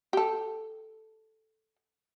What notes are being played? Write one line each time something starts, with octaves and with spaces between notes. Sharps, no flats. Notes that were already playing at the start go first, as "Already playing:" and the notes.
G4 A4